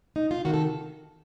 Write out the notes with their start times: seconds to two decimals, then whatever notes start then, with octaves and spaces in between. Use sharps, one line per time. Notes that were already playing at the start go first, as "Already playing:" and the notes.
0.16 D#4
0.31 F4
0.45 C3 D#3 F#4
0.54 A4